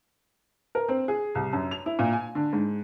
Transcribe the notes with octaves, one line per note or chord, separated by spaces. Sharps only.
A#4
C4
G#4
C2
F#2
F7
E4
A#2
G#5
D3
G#2